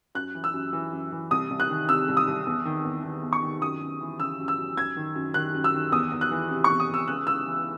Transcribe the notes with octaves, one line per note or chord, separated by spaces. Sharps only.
F#2 F#6
E3
E6
F#2
E3
F#2
E3
C2 D#6
C2
F#6
D#3
C3 E6
C2
D#6
C2
E2
D#3
E2
D#3
E2
C#6
D#3
F#2 D#6
F#2
E3
C#3 E6
F#2
E6
F#2
F#2 G#6
D#3
F#2
D#3 F#6
F#2
E6
D#3
E2 D#6
E2
F#6
E3
C3
C#6
E2
D#6
E2 E6
C#2 F#6
C#2 E6
E3